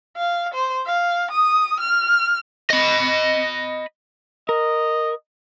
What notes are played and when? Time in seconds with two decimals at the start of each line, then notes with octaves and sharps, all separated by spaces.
0.17 F5
0.54 C5
0.86 F5
1.31 D#6
1.80 F6
2.70 D#5 B5
4.49 A#4 D#5